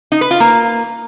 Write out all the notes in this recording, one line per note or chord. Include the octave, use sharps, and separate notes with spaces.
D#4
B4
F4
A#3